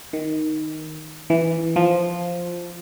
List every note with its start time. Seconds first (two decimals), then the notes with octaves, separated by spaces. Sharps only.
0.13 D#3
1.30 E3
1.76 F3